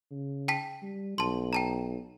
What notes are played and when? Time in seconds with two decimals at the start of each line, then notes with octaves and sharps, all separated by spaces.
0.11 C#3
0.48 G5 A5 B6
0.83 G3
1.18 B1 A5 C6
1.53 G5 A5 A#5